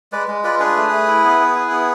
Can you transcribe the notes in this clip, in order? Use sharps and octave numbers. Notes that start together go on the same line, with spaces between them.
G#3 B4 D5
G#3
F4 B4 D5
D4 G#4 B4
A3
A3
E4
B3
B3
E4
B3